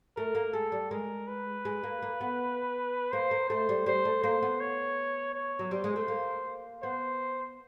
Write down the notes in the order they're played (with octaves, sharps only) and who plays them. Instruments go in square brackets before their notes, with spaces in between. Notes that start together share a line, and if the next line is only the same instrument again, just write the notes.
[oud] A3 [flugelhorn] A#4
[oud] A#3
[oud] G#3 [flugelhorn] A4
[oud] G3
[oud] G#3 [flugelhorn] A#4
[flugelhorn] B4
[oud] G#3
A#3
A#3
B3
[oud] A#3 [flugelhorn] C5
[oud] A#3
[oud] A3 [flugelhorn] C5
[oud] G3
[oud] G3 [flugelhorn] C5
[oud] A3
[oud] A#3 [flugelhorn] C5
[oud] B3
[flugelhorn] C#5
C#5
[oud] F#3
[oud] G3 [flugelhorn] C5
[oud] G#3
A3
A#3
[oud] B3 [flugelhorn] C5